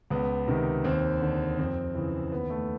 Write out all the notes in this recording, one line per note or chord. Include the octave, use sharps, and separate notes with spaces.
C#2 B3
C3 D#3
D#2 C4
D3
F2 C4
C#3 E3
D#2 B3
A3